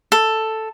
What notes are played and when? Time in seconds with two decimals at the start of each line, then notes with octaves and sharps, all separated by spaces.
0.12 A4